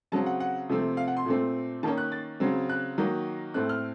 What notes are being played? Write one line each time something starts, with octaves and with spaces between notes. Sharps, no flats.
C#3 F#3 C4 A5
F#5
F#5
C3 F3 A3 C4
F5
F#5
C6
A#2 A3 C4
D#3 A#3 C#4 A5
F#6
A6
C#3 F#3 C4
F#6
D#3 F#3 A#3
A2 A3 C4 F#6
F6